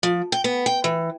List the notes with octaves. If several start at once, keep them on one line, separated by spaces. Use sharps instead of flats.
F3
G5
B3
G5
E3